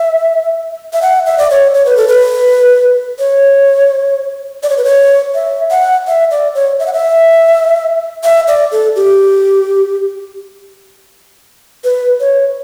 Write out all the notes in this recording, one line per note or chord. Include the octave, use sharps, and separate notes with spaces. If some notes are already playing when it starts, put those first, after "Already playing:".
Already playing: E5
E5
F#5
E5
D5
C#5
C#5
B4
A4
B4
C#5
D5
C#5
B4
C#5
E5
F#5
E5
D5
C#5
E5
F#5
E5
E5
D5
A4
G4
B4
C#5